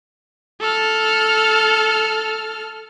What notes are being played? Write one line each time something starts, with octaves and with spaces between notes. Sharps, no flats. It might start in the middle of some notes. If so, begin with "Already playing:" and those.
A4 F6